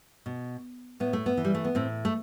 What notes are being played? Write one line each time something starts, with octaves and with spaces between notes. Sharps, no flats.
B2
A2 B3
A3
B3
E3
G3
A3
B3
A2 C4
A3